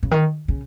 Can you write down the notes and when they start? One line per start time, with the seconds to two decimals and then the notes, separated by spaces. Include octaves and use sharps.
0.03 C#3
0.11 D#3
0.48 C#3